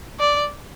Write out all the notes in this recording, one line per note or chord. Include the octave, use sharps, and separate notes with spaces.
D5